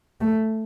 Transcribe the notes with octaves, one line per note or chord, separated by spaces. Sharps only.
A3